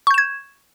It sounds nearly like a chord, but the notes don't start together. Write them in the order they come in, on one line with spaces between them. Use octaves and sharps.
C#6 G6 E7 G#6